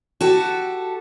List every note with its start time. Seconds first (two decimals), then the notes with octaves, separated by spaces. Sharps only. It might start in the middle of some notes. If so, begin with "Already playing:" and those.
0.21 F#4 G4 A4